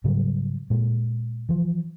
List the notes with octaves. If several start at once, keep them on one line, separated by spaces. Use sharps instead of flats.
G#2 C#3 F#3 G3
A#2 G#3
E3 F3